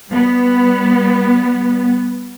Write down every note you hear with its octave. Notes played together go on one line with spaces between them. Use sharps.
G3 B3